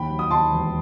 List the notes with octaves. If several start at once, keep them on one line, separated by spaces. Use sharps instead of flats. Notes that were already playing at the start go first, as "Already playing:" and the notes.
Already playing: D#2 G5 B5
F#3
D#6
D#2 A5 C6
E1